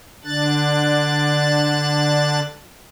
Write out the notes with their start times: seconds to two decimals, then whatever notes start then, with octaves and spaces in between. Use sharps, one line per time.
0.25 D3 D4 F#6 A6